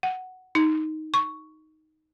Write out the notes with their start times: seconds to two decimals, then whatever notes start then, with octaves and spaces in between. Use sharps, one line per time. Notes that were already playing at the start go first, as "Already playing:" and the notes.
0.03 F#5
0.55 D#4
1.14 C#6